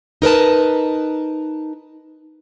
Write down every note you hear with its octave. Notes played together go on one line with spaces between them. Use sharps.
D#4 A#4 B4 A5